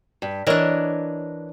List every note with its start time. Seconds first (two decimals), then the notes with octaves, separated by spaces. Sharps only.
0.22 G2
0.47 E3 D4 A#4 C#5 D#5